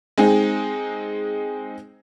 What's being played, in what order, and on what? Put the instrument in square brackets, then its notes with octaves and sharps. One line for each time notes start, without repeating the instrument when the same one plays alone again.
[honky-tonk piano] G#3 C4 D#4 G#4